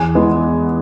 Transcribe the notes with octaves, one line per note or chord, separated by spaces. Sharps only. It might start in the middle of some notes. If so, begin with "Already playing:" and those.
Already playing: E2 G#5
E3 G#3 B3